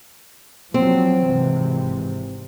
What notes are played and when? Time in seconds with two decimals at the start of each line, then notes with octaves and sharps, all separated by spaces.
0.74 F3 F#3 C4
1.24 G#1 C3 E3